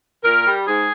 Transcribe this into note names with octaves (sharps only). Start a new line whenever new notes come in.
A#2 A#4
G3
G#2 G#4